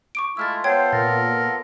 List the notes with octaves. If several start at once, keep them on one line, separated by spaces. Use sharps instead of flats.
C#6 D6 D7
G#3 A3 E4 F4 E6 F6 A6
B3 F4 A4 C5 C#5 G5 G#6
A#2 A#4 A6